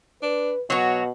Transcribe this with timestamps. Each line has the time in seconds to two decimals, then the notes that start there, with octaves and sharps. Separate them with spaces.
0.23 D4 B4
0.70 B2 F#3 F#4 C#5